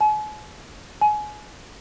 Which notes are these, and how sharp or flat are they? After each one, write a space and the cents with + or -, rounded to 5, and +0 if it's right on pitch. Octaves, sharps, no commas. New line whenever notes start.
G#5 +45
G#5 +25